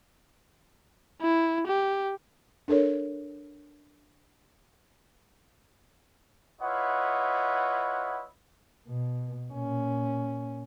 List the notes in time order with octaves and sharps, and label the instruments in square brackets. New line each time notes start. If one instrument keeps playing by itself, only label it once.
[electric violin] E4
G4
[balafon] D4 A4 A#4 C#5
[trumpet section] E4 F4 B4 C#5 D#5 F#5
[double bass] B2
A#2 C#4